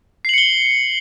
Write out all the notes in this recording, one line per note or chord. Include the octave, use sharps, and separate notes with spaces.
C7 C#7 F#7 G7